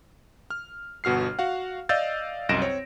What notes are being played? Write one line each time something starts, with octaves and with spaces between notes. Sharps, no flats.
F6
G1 B2 F#4 F6 C7
F#4 F5 F#5
D5 D#5 F5 E6 G6 A6
C2 F#2 D#5 A#6 D7 E7
C4 C#5